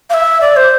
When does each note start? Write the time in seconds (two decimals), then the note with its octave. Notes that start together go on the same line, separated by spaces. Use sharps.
0.10 F5
0.14 E5
0.41 D5
0.56 C5